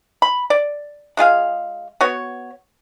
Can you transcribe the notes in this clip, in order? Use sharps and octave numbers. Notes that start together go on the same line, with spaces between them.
B5
D5
G#3 F4 G#4 F5
B3 F#4 C#5